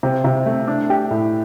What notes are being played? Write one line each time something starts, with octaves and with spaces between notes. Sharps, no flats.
C3
C3
A3
D4
G4
A2